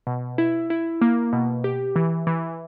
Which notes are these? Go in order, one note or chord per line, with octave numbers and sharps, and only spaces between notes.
B2
E4
E4
A#3
B2
G4
E3
E3